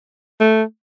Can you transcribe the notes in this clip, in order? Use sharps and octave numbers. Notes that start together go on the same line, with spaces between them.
A3